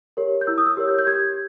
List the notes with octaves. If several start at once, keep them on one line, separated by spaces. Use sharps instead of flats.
G4 A#4 C#5
G6
E4 E6
D#6
E6
G4 A#4 C#5
G6
G6
G4 G#6